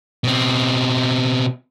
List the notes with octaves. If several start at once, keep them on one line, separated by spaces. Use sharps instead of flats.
B2 C4